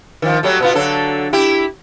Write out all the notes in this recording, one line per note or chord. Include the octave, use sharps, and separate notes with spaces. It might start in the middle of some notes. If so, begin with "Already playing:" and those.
D#3 F3
F#3 G3 A3
B2 B3 F4
D3 F#3 A4
E4 G4